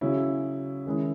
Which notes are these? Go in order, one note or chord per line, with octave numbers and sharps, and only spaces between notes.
C#3 F#3 C#4 E4
D#3 G#3 C#4 E4